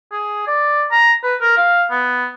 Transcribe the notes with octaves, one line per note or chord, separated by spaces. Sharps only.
G#4
D5
A#5
B4
A#4
F5
B3